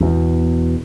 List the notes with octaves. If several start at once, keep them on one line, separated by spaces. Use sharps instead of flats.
E2 B2